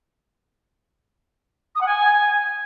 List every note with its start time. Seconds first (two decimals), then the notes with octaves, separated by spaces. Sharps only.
1.75 D#6
1.80 F#5
1.86 G#5